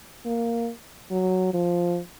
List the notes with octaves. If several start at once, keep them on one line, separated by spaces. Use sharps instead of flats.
A#3
F#3
F3